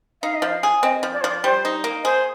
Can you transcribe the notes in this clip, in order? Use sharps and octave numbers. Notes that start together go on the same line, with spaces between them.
D#4 F5
D#5
F3
F5
G#4
C4 D#5
F3
D5
C5
F3 D5
G3 C5
D#4
A#3
G#4 C5